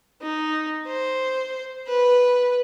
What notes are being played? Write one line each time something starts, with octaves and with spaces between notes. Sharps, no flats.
D#4
C5
B4